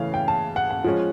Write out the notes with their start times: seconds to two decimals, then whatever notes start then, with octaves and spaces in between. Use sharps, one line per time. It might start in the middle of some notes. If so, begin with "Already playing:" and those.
Already playing: C#3 E3 A3 C#4 F5
0.14 G5
0.28 A5
0.56 F#5
0.71 F#5
0.84 F3 G#3 C#4